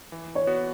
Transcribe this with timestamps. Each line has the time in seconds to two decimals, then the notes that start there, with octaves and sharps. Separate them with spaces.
0.12 E3
0.35 C#5
0.47 B3 F#4